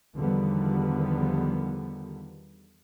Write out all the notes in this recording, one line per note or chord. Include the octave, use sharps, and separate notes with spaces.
E2 D3 D#3 F3 G3 B3